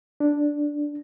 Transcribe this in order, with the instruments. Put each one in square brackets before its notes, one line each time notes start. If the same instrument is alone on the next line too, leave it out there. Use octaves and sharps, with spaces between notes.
[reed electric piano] D4